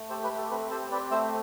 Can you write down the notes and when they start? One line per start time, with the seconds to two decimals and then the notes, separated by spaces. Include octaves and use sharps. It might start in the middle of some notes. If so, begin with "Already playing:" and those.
Already playing: A3
0.09 G4 A4 C5
0.24 B4
0.31 A3
0.38 A4
0.50 C4 B4
0.70 G4 A4 C5
0.91 C4 B4 D5
1.11 A3 C5 E5